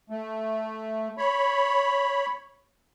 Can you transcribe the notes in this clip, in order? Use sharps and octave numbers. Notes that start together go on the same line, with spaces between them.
A3
C#5 B5